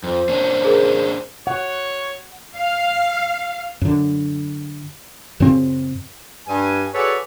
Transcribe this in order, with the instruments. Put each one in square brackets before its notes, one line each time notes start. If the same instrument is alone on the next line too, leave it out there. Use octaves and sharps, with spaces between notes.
[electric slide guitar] F2 [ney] C5
[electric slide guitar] A#3 C#4 D4
[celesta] G#4 A#4
[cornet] C#5 [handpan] F#5
[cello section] F5
[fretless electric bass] F#2 D3
F#2 A#2 C#3 C4
[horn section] G2 G#5
F#4 G#4 A4 B4 C#5 D5